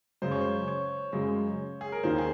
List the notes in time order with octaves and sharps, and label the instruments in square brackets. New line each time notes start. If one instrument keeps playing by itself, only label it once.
[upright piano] F#2 C#3 G#3 [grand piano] C5
[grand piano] C#5
C5
C#5
[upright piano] F#2 C#3 G#3
[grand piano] G#4
A#4
[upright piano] D#2 D#3 A#3 [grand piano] C5
[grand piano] G#4